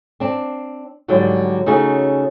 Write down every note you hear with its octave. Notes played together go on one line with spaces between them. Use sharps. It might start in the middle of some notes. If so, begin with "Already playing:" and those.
C4 D4
G#2 D3 F#3 G3
C#3 A3 C#4 D#4 F#4 G#4